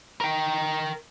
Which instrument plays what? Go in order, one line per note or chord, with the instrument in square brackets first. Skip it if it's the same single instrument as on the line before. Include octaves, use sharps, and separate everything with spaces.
[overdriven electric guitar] A#4 G5